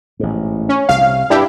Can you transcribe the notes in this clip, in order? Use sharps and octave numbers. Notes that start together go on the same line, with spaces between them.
A1 G#2
C#4
C2 C3 F5
G2 D4 E4 G4